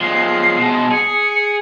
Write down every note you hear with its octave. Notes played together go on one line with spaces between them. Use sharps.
F3 G#3 C7
B2 G#3
G#4 C#7